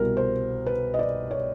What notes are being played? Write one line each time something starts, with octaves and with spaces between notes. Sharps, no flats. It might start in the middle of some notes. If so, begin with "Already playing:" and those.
Already playing: C2 B2 A#4
C5
B4
D#5
D5
C#5